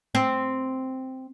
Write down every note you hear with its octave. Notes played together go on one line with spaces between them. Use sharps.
C4